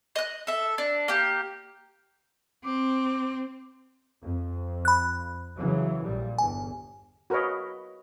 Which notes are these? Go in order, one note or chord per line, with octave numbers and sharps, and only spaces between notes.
D#5 F#6
A4 E5
D4
A#3 G4
C4 D6
F2
B5 F#6
C#3 E3 F#3
A#1 A#2 G3
G1 E2 G#5
F#4 A#4 B4 C#5 D#5